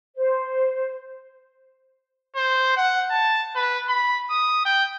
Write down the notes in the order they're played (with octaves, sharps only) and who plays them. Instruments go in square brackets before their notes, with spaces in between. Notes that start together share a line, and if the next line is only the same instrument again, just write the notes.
[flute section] C5
[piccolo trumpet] C5
F#5
A5
B4
B5
D#6
G5